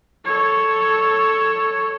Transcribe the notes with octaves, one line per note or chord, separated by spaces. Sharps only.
A4 C#5